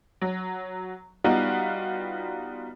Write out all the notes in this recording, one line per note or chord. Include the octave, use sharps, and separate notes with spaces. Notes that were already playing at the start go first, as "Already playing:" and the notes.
F#3
G3 B3 D#4 F4 F#4